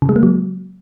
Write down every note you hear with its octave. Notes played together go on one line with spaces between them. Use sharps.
C#3
G#3
A#3
F#3